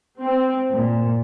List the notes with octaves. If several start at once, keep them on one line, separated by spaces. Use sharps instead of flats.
C4
A#2